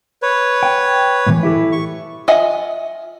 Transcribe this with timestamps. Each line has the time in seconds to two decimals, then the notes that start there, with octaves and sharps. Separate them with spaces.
0.22 B4 C#5
0.63 G5
1.26 A2 D#3 E3
1.43 E4 G4 A4
1.72 C#6
2.28 F4 D#5 E5 F#5 G#5